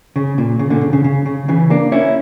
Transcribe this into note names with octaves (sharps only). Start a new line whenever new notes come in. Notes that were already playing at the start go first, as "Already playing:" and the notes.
C#3
A#2
C#3
A#2 D3
C#3
C#3
C#3
C#3
C#3 E3
A#3 D4
C#4 E4